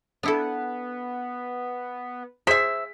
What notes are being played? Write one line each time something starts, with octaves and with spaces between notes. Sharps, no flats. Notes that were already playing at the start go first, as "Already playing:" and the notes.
B3 D4 E4 A4
G#4 C5 E5 B6